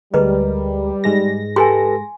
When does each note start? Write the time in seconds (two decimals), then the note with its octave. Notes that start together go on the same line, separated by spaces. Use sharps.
0.14 D2 G3 G#3 A#4 B4 D#5
1.04 G#2 G#3 A#6
1.56 G4 A4 B4 G#5 C6